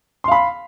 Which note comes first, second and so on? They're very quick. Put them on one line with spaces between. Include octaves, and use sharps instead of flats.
C6 F5 B5